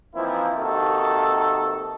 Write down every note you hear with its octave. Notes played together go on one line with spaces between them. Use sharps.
E3 F3 A#3 C4 D#4 E4
C3 D#3 A#3 F#4 A4